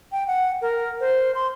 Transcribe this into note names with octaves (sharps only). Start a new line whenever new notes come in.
G5
F#5
A#4
C5
C6